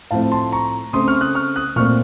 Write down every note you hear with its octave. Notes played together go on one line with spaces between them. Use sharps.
A2 F3 A3 C4 F5 A5
A5 C6
A#5 C#6
C#3 A3 C4 C6 D#6
C#6 F6
D#6 F#6
C#6 F6
D#6 F#6
A#2 A3 C4 C#6 F6